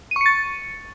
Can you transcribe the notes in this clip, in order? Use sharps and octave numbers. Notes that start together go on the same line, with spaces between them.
C#6 A6 C#7 D#7